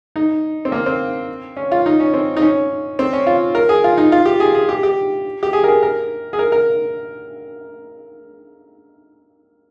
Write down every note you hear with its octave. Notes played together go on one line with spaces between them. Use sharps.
D#4
C4
A#3
C4
C#4
F4
D#4
C#4
C4
D#4
C#4
C4
C#4
F4
A#4
G#4
F4
D#4
F4
G4
G#4
G#4
G4
G4
G4
G#4
A#4
G#4
A#4
G#4
A#4
A#4